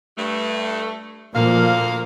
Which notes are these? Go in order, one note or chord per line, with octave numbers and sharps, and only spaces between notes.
G2 A3
D2 A#2 F3 A#3 F5